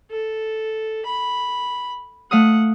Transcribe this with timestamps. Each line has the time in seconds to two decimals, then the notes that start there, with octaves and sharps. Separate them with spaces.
0.11 A4
1.05 B5
2.31 A3 F5 F#5 D#6